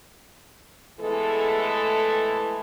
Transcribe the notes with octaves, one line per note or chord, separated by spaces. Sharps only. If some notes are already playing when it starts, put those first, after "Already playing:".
E3 G#3 A3 B3 A4